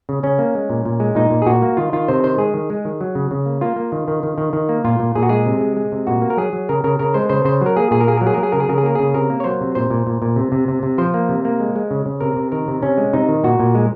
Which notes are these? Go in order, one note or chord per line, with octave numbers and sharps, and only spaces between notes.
C#3
C#3 C#4
A#3
G#3
A#2
A#2
G#3
A#2 D#4
A#2
G#4
A#2 F#4
A#3
D#3 F4
D#3 F4
C3 C5
D#3 C5
G#3 G#4
D#3
G#3
D#3
F#3
C#3
C#3
A#3
A#3 F4
A#3
D#3
D#3
D#3
D#3
D#3
A#3
A#2 F4
A#2
A#2 G#4
F#4
G#3 G#4
C3
G#3
G#3
C3
A#2 F#4
A#3
A#4
F#3 G#4
F#3
C#3 A#4
C#3 A#4
C#3 A#4
G#3 C5
C#3 C5
C#3 C5
F#3 A#4
A#3 G#4
A#2 G#4
A#4
A#3 G#4
A#4
F#3
G#4
F#3 A#4
G#4
C#3 A#4
G#4
C#3 A#4
G#4
A#3 A#4
C#3 G#4
C3 A#4
A#3
C#5
F#3 C5
C3
A#2 C5
A#2
A#2
A#2
C3
C3
C3
C3
F3 C5
A#3
C3
A#3
G#3
G#3
C#3
C#3
C3 A#4
C3
D#3 A#4
C3
C3 C#4
G#3
C3 D#4
D#3
A#2 F#4
A#2
G#3